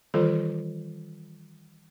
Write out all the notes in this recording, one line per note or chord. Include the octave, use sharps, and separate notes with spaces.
D#3 E3 G3 F4 A4 C5